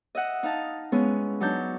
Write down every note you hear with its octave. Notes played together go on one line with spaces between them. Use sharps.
D#5 E5 F#5
D#4 F5 A5
G#3 B3 C#4 E4
F#3 D4 D#4 A5 G6